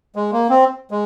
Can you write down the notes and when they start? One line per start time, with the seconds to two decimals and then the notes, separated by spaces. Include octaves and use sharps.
0.16 G#3
0.32 A#3
0.49 C4
0.91 G#3